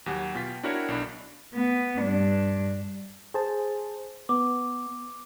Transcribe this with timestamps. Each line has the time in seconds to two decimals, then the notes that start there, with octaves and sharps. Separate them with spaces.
0.06 D#2 F#3 G4 F#5 G#5
0.35 B2 F4 G5 B6
0.63 D4 E4 F#4 A#4 C#5 G5
0.88 B1 D4 B5
1.54 B3
2.00 G2 D4
3.34 G#4 C5 A5
4.29 B3 D6